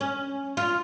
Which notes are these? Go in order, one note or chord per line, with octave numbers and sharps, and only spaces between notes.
C#4
F4